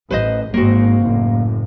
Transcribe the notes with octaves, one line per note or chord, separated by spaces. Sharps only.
A1 B4 C5 D#5
G#1 G#2 A#3 C4 F#4
F#1 A2